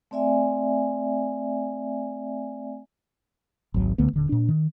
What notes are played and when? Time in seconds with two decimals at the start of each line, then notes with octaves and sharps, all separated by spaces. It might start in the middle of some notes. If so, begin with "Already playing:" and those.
0.11 A3 C4 D5 E5 G#5
3.74 G#1 C#2 F#3
3.98 C#2 D3 A3 B3
4.13 D#1 D3
4.29 A#2 D4
4.49 D#3